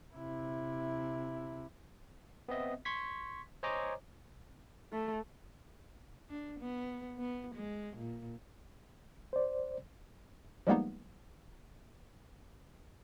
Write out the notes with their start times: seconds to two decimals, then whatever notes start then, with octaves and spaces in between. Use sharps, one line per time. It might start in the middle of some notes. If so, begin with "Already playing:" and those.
0.13 C3 E4
2.49 B3 C4 D#5 E5
2.85 C6 C#6 G#6 B6
3.63 C5 C#5 D#5 G#5 A#5 D6
4.92 A3
6.29 D4
6.60 B3
7.18 B3
7.55 G#3
7.97 A#2
9.33 C5 D5
10.67 F3 G3 G#3 A#3 B3 D#4